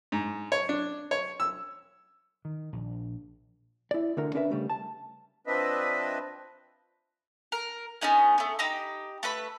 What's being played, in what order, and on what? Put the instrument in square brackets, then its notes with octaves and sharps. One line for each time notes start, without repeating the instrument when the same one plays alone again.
[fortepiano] G#2
C#5
D4
C#5
E6
[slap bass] D#3
A#1
[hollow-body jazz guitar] E4 D5
D2 D3 A#4
C#4 D4 A#4 B4 E5
C#3 G3 A3
A5
[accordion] F3 C4 D4 B4 D#5 E5
[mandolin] A#4
B3 C#4 D#4 G#4
A3 B3
D#4 G4 A#5 B5
A3 B4 B5